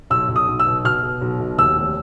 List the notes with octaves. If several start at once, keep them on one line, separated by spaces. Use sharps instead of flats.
B1 E6
B1
D#6
B1
E6
B2
B2 F6
B2
B1
B2
D#2 E6
F1